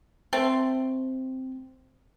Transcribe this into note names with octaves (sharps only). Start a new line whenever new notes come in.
A3 C4 C6